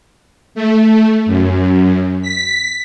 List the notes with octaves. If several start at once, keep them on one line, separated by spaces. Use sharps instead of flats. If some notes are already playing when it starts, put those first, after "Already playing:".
A3
F#2
B6